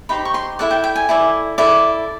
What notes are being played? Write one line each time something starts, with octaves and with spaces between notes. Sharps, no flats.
D#4 G4 C5 B5
C#6
C6
E4 A4 D5 F#5
G5
G5
G#5
E4 A4 D5
E4 A4 D5